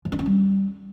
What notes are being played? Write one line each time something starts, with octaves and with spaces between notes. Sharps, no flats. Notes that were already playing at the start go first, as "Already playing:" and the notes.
F3
D4
C#4
G3